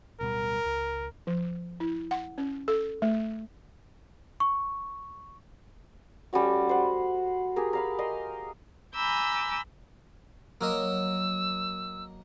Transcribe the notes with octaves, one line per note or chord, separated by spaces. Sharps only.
D1 B2 G3 A#4
C#2
F3
E4
F#5
C#4
A4
A3
C#6
G3 A3 C#4 F#4
C5 F#5
G4 G#4 A#4
A#4 F5 B5
A#4 D#5 C6
G#5 A#5 B5 D6 E6 G6
F#3 A#3 A#4 D#5 E6